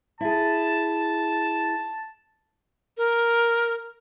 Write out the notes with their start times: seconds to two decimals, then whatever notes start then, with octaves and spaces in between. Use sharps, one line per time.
0.21 E4 G#4 A5
2.97 A#4